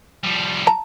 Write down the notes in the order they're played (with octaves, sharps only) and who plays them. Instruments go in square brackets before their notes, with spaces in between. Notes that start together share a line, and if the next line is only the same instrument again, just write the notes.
[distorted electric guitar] F3 G3
[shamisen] A5 A#5